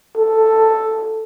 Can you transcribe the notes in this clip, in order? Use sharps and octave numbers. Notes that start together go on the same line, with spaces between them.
A4